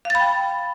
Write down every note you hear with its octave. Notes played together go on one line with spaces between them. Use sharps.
F5 G5 B5 A6